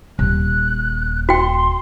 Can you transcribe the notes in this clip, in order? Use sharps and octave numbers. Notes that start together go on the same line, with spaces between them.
D#1 F#6
F#4 G5 C6